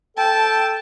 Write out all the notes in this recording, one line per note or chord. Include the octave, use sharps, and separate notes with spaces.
A4 G5 A5